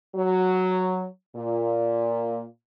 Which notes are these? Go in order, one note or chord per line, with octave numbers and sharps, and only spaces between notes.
F#3
A#2